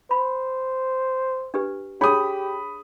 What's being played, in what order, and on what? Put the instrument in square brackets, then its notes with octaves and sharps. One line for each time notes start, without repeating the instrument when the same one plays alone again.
[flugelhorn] C5 [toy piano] B5
[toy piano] D4 G4 B4
[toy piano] D4 G#4 C#5 [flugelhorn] G4 [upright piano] B5 D#6